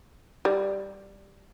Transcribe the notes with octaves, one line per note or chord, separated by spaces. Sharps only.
G3